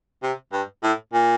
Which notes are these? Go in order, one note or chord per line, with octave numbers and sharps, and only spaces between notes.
C3
G2
A2
A#2